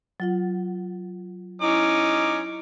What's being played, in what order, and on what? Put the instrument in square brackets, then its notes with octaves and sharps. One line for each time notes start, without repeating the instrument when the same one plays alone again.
[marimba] F#3 F4 F#5
[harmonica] C#4 D#4 D6 [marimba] E4